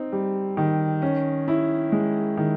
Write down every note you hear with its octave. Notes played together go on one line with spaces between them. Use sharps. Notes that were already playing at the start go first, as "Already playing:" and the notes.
Already playing: C4 D#4
G3
D#3
C#4
E4
G#3
D#3